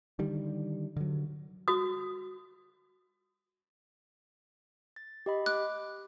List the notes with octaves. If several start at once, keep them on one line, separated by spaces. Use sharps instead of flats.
D3 D#3 G3
D3 F#3
F#4 D#6
A6
G4 D#5 B5
D6 F#6